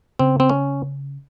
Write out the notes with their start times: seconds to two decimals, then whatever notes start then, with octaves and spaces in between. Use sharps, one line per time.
0.19 C#3 C4
0.40 C4
0.50 C#4